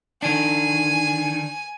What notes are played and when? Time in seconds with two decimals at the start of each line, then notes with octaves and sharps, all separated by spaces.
0.23 D#3 D4 G#5